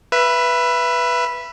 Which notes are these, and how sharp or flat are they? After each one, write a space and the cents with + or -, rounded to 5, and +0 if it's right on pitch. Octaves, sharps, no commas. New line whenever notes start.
B4 -5 E5 +25